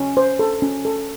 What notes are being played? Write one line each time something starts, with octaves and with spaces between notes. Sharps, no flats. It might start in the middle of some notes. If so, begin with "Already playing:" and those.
Already playing: C#4
C5
A4
C#4
A4